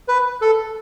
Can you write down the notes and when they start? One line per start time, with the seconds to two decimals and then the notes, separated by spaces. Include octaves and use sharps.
0.08 B4
0.41 A4